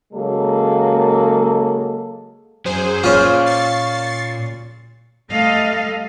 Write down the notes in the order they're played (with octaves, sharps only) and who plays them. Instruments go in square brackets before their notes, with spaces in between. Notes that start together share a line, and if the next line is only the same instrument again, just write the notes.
[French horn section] C#3 F#3 G#3 A#3 A4
[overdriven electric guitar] F#2 F#3 [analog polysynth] G#4 C5
[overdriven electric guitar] A#2 [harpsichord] C#4 F4
[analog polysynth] C#6 A6 C7
[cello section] G3 A3 A4 D#5 F5